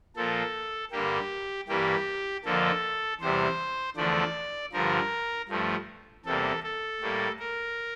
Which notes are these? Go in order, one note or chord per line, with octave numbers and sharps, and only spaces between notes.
A#2 F3 A#3 A4
G2 D3 G3 A#3 G4
G2 E3 G3 A#3 G4
F2 D3 F3 A#3 A4
E2 C3 G3 C5
E2 D3 F3 A3 D5
G2 D3 F3 A#4
G2 F3 A3
E2 C3 G3 A#3 A4
A4
A2 G3 A#3
A#4